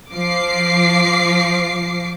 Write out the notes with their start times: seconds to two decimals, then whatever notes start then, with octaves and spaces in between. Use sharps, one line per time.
0.12 F3 D6 C7